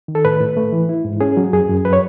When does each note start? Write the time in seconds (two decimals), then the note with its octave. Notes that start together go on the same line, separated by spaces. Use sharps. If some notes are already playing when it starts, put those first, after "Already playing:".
0.08 D#3
0.15 A4
0.25 A2 B4
0.41 A2
0.57 A3
0.73 E3
0.89 E4
1.05 G#2
1.21 C#4 G#4
1.37 F#3
1.53 F#2 G#4
1.69 F#2
1.85 F#3 B4
1.93 C#5